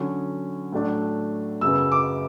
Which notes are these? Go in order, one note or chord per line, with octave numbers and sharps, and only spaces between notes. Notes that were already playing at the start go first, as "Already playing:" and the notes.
Already playing: D3 F#3 C#4
A2 F#3 A3 D4
F#2 C#3 F#3 B3 E6
D6